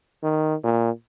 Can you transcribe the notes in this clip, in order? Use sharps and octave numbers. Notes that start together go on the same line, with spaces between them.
D#3
A#2